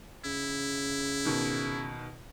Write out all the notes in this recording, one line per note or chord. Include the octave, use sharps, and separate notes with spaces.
C#3 E4
B2 D#3